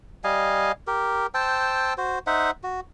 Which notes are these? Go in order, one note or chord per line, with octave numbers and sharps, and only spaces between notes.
G3 D#5 F5 G#5
G4 A#4
C5 G5 A5 E6
F#4 C5
D#4 C5 E5 F#5
F#4